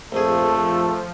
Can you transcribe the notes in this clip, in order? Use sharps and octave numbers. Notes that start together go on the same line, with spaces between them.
A#1 F2 F3 A3 G#4 A4